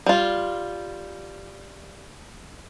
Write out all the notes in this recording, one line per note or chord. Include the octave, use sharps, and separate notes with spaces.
G3 F4